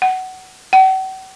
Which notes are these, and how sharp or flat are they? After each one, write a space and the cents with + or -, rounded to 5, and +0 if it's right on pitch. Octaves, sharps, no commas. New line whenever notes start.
F#5 +15
F#5 +45